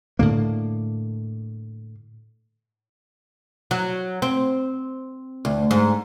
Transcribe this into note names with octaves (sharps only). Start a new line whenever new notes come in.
A2 D3 A#3
F#3
C4
D2
G#2